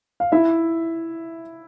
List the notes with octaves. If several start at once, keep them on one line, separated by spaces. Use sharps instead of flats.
F5
E4 E5